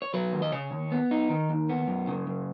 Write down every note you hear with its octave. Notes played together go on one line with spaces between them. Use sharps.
C#5
F#3 B4
D#2
D#5
C#3 C#5
D#2
B3
D#4
D#3
D#2
B3
F#2
C#3
F#2